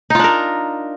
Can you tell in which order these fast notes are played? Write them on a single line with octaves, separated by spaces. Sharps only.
D#4 F4 D4 A#4